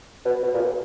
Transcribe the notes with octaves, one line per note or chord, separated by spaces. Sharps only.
B2
B2
A#2
B2